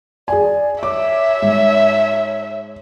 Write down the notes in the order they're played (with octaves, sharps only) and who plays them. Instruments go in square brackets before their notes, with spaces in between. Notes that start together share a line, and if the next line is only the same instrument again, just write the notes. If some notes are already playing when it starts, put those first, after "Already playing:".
[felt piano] G#4 G#5 [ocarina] D5
[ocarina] C#5 [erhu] E5 [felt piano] D6
[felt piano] G#2